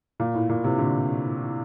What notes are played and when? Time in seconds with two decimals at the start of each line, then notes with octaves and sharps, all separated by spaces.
0.20 A#2
0.34 A2
0.49 A#2
0.64 A2 C3
0.78 A#2 D3